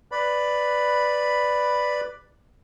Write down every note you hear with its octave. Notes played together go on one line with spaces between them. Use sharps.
B4 D5 B5